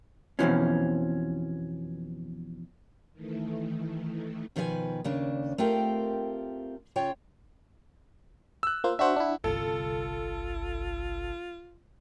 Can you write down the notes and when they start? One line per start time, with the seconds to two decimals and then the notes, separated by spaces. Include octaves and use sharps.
0.39 F2 B2 D3 E3 F3 C#4
3.13 D#3 E3 A3
4.56 B2 D#3 F3 B4 D#5 G#5
5.04 D#2 C#3 D4
5.58 A3 C4 F4 G4 A#4 G5
6.96 C#3 F4 C#5 G5
8.63 E6 F#6
8.84 A#3 F4 C5
8.99 D4 F#4 C5 E5 F#5
9.16 D4 E4
9.44 G1 C2 F4 A4